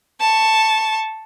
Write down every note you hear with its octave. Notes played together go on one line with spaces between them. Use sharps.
A5 C#6